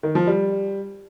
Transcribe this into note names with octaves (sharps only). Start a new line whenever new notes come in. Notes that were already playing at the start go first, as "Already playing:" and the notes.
D#3
F3
G3